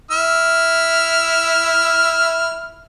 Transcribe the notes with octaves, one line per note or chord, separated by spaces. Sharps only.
E4 E5 F6